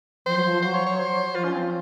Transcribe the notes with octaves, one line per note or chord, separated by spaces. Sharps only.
F3 C5
F#3
F3
F#3 C5
C#5
C#5
C5
F3 F4
C#4
C4